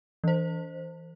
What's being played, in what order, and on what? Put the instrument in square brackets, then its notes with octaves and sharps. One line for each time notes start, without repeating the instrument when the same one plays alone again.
[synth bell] E3 C5